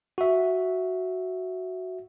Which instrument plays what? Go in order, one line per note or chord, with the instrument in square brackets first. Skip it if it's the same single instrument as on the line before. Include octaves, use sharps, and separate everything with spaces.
[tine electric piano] F#4 E5